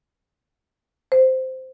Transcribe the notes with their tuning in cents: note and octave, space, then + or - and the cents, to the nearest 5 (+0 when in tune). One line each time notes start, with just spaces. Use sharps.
C5 -10